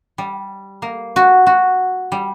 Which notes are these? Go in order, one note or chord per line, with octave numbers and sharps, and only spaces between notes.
G3
A#3
F#4
F#4
G3